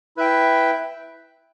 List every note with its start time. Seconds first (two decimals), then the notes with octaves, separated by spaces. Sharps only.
0.17 E4 B4 E5 G5